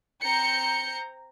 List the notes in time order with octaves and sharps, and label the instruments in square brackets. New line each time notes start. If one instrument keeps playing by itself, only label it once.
[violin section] C4 A#5 G6 C#7